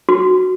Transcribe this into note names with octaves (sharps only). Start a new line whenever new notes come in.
F#4